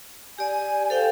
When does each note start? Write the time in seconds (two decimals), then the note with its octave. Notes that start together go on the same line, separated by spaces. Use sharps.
0.39 G4 D5 G#5
0.90 A4 C5 F5 G5